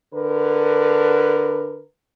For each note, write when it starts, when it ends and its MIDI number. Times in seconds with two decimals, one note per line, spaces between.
0.14 1.82 50
0.14 1.82 70
0.14 1.82 71